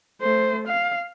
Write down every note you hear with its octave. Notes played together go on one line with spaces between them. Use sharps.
A3 C5
F5